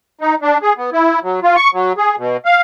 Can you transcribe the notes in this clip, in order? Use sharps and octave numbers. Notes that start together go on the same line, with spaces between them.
D#4
D4
G#4
B3
E4
F#3
F4
C#6
F#3
G#4
B2
F5